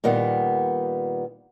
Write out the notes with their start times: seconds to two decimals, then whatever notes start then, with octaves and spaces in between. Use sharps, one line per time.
0.04 A#2 D#3 G3 B3